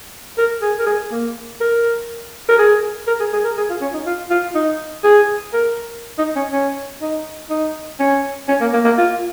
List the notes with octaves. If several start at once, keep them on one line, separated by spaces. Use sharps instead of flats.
A#4
G#4
A#4
G#4
A#3
A#4
A#4
G#4
A#4
G#4
G#4
A#4
G#4
F4
C#4
D#4
F4
F4
D#4
G#4
A#4
D#4
C#4
C#4
D#4
D#4
C#4
C#4
A#3
A#3
A#3
F4